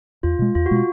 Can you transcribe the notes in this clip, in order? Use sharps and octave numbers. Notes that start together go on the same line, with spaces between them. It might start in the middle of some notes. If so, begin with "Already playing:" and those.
E2 F4
B2 G#3
E2 F4
F#4
B2 G#3 F4